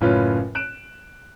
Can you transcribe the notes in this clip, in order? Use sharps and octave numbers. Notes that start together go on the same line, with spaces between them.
F#1 A2 C#4 F4 B4
F#6 D7 E7